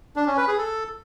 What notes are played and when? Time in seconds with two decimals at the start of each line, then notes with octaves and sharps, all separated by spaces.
0.16 D4
0.27 C#4
0.37 B4
0.48 G#4
0.58 A4